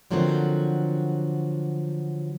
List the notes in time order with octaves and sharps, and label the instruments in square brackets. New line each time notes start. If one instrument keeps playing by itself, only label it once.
[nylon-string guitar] D3 F3 F#3 A3 A#3 C4